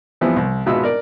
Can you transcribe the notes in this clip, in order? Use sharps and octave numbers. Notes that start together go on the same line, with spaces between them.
E3 F3 G3 B3 C4 E4
C2
G#1 B2 B3 F4 E5 E6
A#4 D5